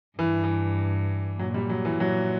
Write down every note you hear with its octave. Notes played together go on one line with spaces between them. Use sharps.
G2 E3
E3
A#2 F#3
G3
F#3
E3
A#2 F#3